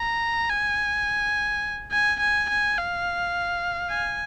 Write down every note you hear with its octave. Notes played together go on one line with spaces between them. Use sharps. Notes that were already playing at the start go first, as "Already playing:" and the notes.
Already playing: A#5
G#5
G#5
G#5
G#5
F5
G#5